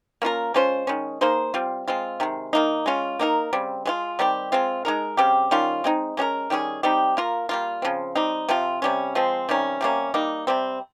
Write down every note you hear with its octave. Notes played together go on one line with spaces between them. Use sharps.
A#3 C#4 F4 A#4
G#3 C#4 F4 C5
D#3 G#3 C#4
A#3 D#4 G#4 C5
G3 C4 F4
G#3 C4 F4
C3 D#3 G#3
D#3 A#3 D#4
G#3 C#4 F4
A#3 D#4 G4 A#4
C#3 G3 C4
G#3 C#4 F4
D#3 G3 C4 G4
G#3 C4 F4
G#3 D#4 A#4
C#3 G3 C4 G4
D#3 G3 C#4 F4
G#3 C4 D#4
G#3 C#4 G4 A#4
D#3 G3 C#4 G#4
G3 C4 D#4 G4
A#3 F4 A#4
G3 A#3 F4
C#3 F3 C4
G3 C4 D#4
C3 F3 C4 F4
C3 G3 C#4
F3 G#3 C4
C3 D#3 G3 C#4
C3 G3 A#3 C#4
G3 A#3 D#4
C3 G3 C4